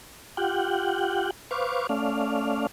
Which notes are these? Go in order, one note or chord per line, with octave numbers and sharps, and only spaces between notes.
F4 G4 F#5 G5
B4 C5 F5 C#6 D6
A3 C#4 D5 F5